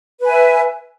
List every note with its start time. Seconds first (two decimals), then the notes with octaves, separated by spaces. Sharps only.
0.21 B4
0.25 G#5
0.29 E5